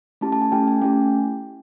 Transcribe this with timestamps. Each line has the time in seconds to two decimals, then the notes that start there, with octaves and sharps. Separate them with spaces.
0.21 A3 C#4 E4 G4 A5
0.32 A5
0.42 G#5
0.52 A3 C#4 E4 G4 G5
0.68 G#5
0.82 A3 C#4 E4 G4 G5